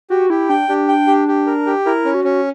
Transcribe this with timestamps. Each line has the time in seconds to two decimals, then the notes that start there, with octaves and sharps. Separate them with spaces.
0.10 F#4 G4
0.30 E4 G4
0.49 D4 G5
0.69 D4 G4
0.88 G5
1.07 G4
1.28 G4
1.47 A#4
1.66 G4
1.86 E4 A#4
2.05 C#4
2.14 F#4
2.24 C#4